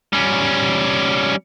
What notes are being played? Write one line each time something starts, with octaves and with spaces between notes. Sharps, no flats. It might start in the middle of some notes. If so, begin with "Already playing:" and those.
G3 C#4